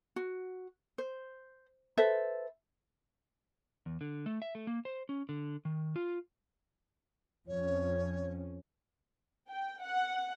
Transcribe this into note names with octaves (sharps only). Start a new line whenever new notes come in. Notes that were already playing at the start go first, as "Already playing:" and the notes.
F#4
C5
A4 B4 C5 E5
E2
D3
A3
E5
A3
A#3
C5
C#4
D3
D#3
F4
F2 C#4 C#5
G5
F#5